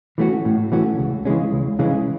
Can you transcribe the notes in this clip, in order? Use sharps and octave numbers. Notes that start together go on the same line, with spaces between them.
E3 A3 C#4 F#4
A2
E3 A3 C#4 F#4
C#2
C#3 E3 G#3 C#4
C#2
C#3 E3 G#3 C#4